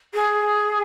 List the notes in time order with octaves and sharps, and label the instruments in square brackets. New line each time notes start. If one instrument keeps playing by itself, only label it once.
[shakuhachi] G#4